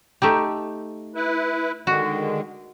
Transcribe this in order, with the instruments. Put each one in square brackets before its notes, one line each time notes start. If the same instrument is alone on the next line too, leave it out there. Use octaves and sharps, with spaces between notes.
[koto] A3 D#4 G4
[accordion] E4 B4
[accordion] D3 D#3 G#3 [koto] F#4